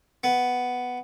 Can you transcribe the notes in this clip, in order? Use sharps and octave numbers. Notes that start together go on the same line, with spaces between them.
B3